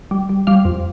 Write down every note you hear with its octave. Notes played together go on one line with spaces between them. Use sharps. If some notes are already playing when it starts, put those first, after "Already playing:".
G3
G3
G3 F5
F2